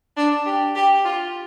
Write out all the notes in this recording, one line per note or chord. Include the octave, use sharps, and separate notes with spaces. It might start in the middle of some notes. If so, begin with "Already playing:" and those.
D4
G4
G4
F4